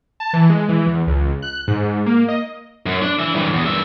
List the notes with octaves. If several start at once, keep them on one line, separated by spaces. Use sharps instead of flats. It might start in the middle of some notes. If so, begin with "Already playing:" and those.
A5
E3
G#3
E3
E2
C#2
F#6
G#2
A#3
D#5
F#2
D4
E3 E5
G2 E3
E2
G2 E5